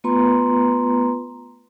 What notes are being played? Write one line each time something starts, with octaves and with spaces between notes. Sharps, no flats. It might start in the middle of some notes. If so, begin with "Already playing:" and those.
A3 B3 F4 B4 A#5 C6